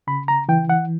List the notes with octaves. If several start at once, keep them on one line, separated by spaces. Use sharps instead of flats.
C#3 B5
A#5
E3 G5
F#5